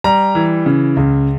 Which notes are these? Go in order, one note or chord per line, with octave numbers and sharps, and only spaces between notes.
G3 A#5
E3
C#3
C#2